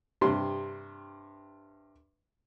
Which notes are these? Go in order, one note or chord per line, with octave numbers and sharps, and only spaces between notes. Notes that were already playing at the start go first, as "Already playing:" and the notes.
G2 C3 C6